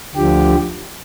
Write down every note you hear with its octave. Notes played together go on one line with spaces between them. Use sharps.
D2 D3 F3 G4